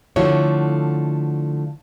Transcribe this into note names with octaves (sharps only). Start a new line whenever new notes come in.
D3 F3 A3 E4 F#4 C#5